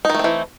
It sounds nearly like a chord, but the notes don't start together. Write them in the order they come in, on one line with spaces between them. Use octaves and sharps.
D#4 D#3 A3 C4 E3